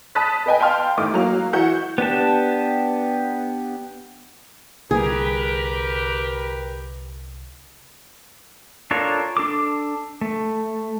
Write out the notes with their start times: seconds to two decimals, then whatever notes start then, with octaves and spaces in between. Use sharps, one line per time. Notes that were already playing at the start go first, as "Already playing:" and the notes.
0.15 A5 B5 D#6 F#6 A6 B6
0.46 B4 D#5 G5 G#5
0.60 F5 G5 A5 C6 F6
0.97 A1 D#3 A3 D6
1.14 F#3 A#3 F5 F7
1.53 E3 F#4 F#5 G6
1.98 B3 D4 G4 A5
4.91 C2 D3 G3 G4 G#4 A#4 B4
8.91 D4 F4 A4 A#4 C#5
9.37 D4 A4 D6
10.21 A3